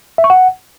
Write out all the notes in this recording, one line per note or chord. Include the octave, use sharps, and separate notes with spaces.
E5
C#6
F#5